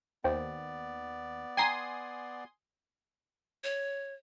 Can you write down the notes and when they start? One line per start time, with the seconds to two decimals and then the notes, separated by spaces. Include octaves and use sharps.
0.24 D#2 B3 C5 D5 G5
1.57 G5 G#5 A#5 C6 D#6
3.64 C#5